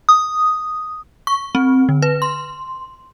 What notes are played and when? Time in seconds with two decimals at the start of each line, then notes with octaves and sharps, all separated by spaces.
0.09 D#6
1.27 C#6
1.55 C4
1.89 D3
2.02 B4
2.22 C6